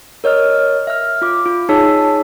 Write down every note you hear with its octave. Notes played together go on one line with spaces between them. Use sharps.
A#4 C#5 D#5 F6
E5 F6
F4 D6
F4
D#4 G#4 C#5 A5 E6 B6